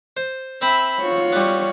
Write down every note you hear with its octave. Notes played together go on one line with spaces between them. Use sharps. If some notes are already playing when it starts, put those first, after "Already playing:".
C5
C4 C5 E5 B5
F4 F#4 C#5
G3 B3